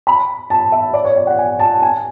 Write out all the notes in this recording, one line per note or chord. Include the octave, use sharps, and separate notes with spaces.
B5
A5
E5
D5
C#5
D5
F#5
G#5
A5
G#5